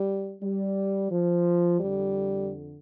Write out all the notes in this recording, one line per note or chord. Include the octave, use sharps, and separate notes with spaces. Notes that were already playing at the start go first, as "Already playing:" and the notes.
Already playing: G3
G3
F3
F2 D3 G3